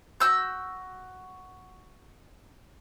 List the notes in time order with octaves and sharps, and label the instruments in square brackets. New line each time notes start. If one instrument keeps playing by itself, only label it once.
[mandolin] F#4 E6 G6